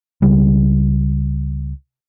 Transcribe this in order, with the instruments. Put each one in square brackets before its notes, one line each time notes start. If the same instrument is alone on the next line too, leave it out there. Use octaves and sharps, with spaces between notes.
[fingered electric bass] C#2 C#3 G3